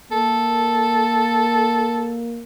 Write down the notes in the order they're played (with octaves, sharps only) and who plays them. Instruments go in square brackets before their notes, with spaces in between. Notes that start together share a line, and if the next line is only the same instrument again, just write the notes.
[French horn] A#3 [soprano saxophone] A4